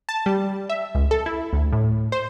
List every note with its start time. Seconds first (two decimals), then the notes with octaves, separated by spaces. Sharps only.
0.09 A5
0.26 G3
0.69 E5
0.95 C#2
1.11 A4
1.26 E4
1.53 D2
1.72 A2
2.12 C5